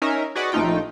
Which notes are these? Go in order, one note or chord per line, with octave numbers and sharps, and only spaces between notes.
C#4 D#4 A#4 E5
F#4 G#4 B4 D5 D#5 F#5
A#1 A3 D#4 F4 G5